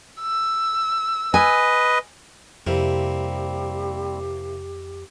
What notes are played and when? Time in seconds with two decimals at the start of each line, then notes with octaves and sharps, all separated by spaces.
0.21 E6
1.34 B4 D#5 G#5
2.67 F2 C3 G3 A#3 C4 E4 G4